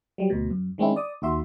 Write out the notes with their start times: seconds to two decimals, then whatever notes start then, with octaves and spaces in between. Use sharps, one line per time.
0.18 F#3 G3
0.30 D2 B2
0.50 F#2
0.78 D#3 G#3 C4 C#4 E4
0.96 D5 D#6
1.22 D#2 D#3 F#4 E5 C6